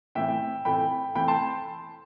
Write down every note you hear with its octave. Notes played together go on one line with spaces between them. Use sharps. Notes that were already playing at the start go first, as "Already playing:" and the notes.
A2 E3 A3 C4 E5 G5
A2 E3 A3 C4 G5 B5
E3 A3 C4 G5 B5
A5 C6